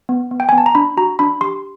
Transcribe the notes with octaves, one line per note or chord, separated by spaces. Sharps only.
B3
B3
G5
G#5
B3
A5
A#5
D4 B5
F#4 A#5
D4 B5
G4 C6